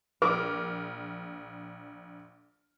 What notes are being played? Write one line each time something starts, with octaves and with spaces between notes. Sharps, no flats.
A#1 A#4 D6 F6